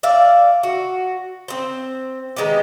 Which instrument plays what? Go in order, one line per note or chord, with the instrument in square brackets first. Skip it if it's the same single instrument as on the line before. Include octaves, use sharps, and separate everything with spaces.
[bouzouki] D5 E5 F5
F#4
C4 C5
D#3 G#3 B3 G4